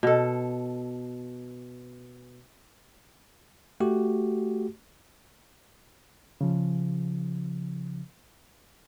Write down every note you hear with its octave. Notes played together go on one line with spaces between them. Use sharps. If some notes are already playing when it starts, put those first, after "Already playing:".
B2 A4
A3 F#4 G4
C#3 F3